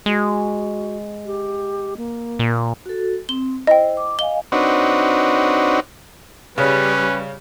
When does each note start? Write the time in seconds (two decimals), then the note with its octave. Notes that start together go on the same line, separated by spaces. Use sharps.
0.06 G#3 F#4
1.26 G4
1.97 A#3
2.39 A#2
2.86 F#4 A4
3.29 C4 G7
3.67 E4 C5 D#5 G5
3.97 D6
4.19 D#5 F5 G#5 G7
4.52 C4 D4 D#4 F#4 B4 C#5
6.58 C#3 G3 C#4 B4